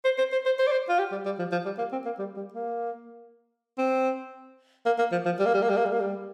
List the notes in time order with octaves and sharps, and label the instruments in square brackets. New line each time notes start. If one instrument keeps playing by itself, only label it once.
[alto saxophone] C5
C5
C5
C5
C5
D5
C5
F4
G4
G3
G3
F3
F3
G3
A#3
C4
A#3
G3
G3
A#3
C4
A#3
A#3
F3
F3
G3
A#3
G3
A#3
G3
A#3
G3
A#3
G3